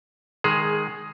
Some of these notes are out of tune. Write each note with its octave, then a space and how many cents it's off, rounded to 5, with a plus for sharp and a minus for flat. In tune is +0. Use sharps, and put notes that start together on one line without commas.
D#3 +0 G#3 +0 G#4 +15